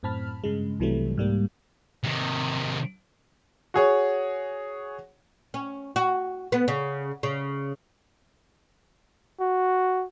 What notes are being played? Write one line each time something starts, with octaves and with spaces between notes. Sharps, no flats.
F#2 A2 C4 A5 B5 F6
G2 C#3 G#3
C2 C3 E3 F#3 G3 A3
G#2 G3 A#3
C3 D#3
F#4 G#4 C#5
C#4
F#4
B3
C#3
C#3
F#4